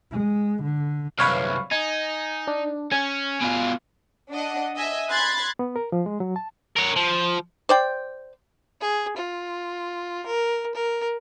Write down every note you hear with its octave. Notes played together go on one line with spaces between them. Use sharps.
G#3
D3
C2 F#2 B4 C#5 F5
D#4 G#5
D4
C#4 G#5
B2 F4
D4 D#5 F#5
D#5 E5 G#5
B5 C6 F#6 G#6 A6
B3
A#4
F3
G#3
F#3
A5
A#4 C#5
F3
C5 D5 G5
G#4
F4
A#4
A#4